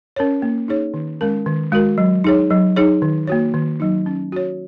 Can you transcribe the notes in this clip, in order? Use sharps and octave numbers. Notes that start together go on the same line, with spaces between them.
C#4 A#4 C#5
A#3
D#4 G#4 C#5
D#3
G#3 C#4 A#4
D#3
G#3 F#4 A#4
F#3
D#4 G#4 C#5
F#3
D#4 G#4 C#5
D#3
A#3 F#4 C#5
D#3
F#3 D#4
C#4
F#4 C#5